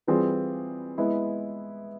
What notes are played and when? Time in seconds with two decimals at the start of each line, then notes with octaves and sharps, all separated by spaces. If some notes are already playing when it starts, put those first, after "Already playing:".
0.07 E3 G3 C4 F4 G#4
0.98 G#3 B3 E4